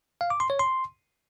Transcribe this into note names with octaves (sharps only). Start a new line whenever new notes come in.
F5
D6
C6
C#5
C6